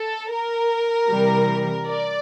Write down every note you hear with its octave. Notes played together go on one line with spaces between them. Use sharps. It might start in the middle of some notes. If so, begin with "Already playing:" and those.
Already playing: A4
A#4
C3 E3 G3
D5